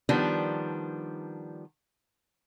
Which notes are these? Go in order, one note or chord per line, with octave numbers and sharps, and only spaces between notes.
D#3 F3 G3 B3 D4